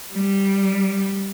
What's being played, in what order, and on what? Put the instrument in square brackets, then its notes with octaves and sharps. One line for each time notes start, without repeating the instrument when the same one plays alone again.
[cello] G3